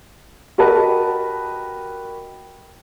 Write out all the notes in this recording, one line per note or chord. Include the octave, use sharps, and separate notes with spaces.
F#4 G4 A#4 B4 D#5 A5